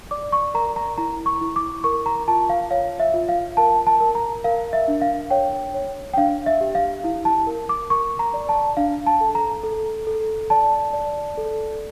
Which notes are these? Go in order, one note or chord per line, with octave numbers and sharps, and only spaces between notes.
D5 D6
C#6
A#4 A#5
A#5
E4 A#5
C#6
E4
D6
A#4 C#6
A#5
F4 A5
F5
C#5 F5
E5
F4
F5
A#4 A5
A5
A#4
A#5
A#4 F5
E5
D4
F5
C#5 G5
C#5
G5
D4 F5
E5
G4
F5
E4
A5
A#4
D6
A#4 C#6
A#5
D5
A5
D4 F5
A5
A4
A#5
A4
A4
D5 A5
D5
A4